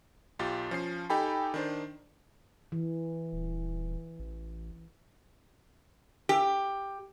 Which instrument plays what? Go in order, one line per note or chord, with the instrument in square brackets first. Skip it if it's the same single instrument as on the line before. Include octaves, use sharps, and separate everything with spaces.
[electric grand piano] B1 F4 G4 A6
F3 C#4 C7
D#4 G4 A4 G5 G#5 B5
D#3 D4 C5
[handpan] E3
[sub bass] D#1
A1
[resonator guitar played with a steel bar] G4